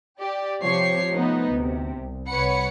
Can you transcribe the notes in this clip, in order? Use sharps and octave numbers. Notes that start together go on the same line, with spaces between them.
G4 D5
C3 F3 G4 C#5 C7
F3 A3 B3 D#4
D2 C3
C2
C2 B4 C#5 F#5 B5 C#7